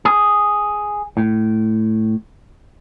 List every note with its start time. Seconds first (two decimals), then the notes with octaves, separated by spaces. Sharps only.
0.05 G#4
1.17 A2